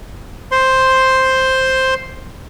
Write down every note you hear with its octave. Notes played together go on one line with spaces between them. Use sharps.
C5 C6